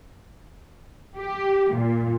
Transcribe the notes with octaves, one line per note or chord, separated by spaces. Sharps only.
G4
A#2